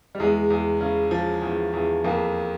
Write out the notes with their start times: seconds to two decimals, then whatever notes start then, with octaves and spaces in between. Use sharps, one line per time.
0.15 G3
0.20 E2 G#3
0.50 E2
0.81 C#3
1.11 F3
1.42 E2
1.73 E2
2.04 F2 A#3